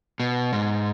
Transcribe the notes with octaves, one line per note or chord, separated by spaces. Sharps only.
B2
G#2